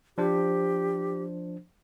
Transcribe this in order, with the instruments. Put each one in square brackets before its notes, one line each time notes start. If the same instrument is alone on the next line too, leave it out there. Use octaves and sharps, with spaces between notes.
[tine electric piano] F3 D4 C5 [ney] G4